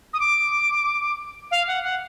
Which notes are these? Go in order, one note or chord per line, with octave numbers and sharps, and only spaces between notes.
D#6
D6
F5
F#5
F#5